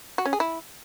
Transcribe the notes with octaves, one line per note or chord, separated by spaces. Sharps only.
F#4
C#4
G#4
E4